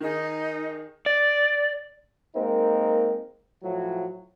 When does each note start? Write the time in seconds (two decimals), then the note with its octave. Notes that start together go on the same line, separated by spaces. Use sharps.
0.01 D#3 D#4 G#4
1.06 D5
2.35 G#3 A#3 C4 D#4 A#4
3.62 A2 F3 F#3